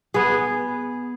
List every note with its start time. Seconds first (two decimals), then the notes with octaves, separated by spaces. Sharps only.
0.14 B3 G#4